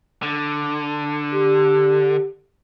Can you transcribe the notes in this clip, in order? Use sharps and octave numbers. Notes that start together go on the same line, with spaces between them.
D3
G4